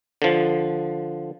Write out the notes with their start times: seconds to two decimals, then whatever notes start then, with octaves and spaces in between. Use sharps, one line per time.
0.22 D3 F3